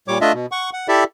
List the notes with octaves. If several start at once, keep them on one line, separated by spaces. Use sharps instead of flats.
A#2 G3 C#5 D6
A3 D4 F4 D#5 E5
B2
F#5 C#6
F#5
E4 G4 A4 D5 E5